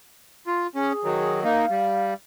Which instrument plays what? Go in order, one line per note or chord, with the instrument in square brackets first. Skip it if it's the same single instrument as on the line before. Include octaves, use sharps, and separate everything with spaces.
[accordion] F4
[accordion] C#4 [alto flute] G#4
[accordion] D#3 F#3
[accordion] A#3 D#4 [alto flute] F5
[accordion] G3